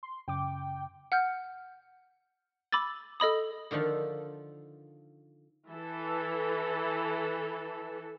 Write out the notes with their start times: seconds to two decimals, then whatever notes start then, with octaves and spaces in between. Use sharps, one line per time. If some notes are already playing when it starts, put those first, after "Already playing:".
0.03 C6
0.28 F#2 C#3 G5 D6
1.12 F#5 F6 G6
2.72 B5 D6 E6 A6
3.20 A4 D#5 B5 D#6
3.71 D3 D#3 F3 F4 A4
5.70 E3 A4